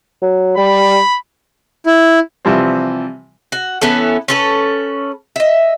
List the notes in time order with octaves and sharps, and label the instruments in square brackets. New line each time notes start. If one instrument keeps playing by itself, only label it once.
[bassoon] F#3
[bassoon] G3 [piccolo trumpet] B5
[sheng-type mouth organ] E4
[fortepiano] C3 E3 F3 G3 C4
[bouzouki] F#4
E3 B3 C#4 A4
C#4 A4 B4
D#5 E5